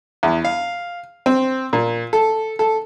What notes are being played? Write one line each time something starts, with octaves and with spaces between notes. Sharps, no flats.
E2
F5
C4
A#2
A4
A4